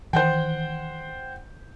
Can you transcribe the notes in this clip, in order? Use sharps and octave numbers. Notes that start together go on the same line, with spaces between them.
D#3 E3 C5 F#5 G5